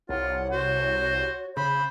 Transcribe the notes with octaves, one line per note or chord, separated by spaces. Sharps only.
C2 F4 C#5 F#5
F#4 C5
C#3 C5 B5